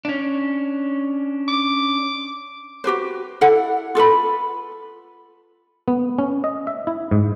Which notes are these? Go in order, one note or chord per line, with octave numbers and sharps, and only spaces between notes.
C#4 D4
D6
F#4 G4 B4 C5
E4 A4 F#5
F4 A4 B4 B5
B3
C#4
D#5
E5
E4
G#2